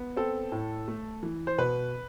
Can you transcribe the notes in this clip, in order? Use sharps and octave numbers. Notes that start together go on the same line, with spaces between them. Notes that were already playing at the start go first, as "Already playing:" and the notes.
Already playing: B3
C4 A4
A2
A3
E3
C5
B2 B4